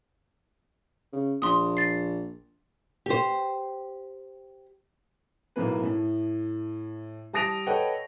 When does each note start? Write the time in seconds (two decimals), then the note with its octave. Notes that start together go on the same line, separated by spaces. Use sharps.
1.13 C#3
1.42 A#1 C6 D#6
1.77 A6 C7
3.06 G4 C5
5.56 B1 A2 A#3 B4
5.83 A2
7.33 G3 A5 D#6 A#6 D7 F7
7.66 A4 B4 C#5 D#5 F#5 G5